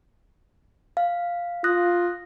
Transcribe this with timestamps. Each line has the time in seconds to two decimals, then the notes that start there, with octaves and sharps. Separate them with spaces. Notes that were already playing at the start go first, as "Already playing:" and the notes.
0.97 F5
1.64 F4 D#6 F#6 A#6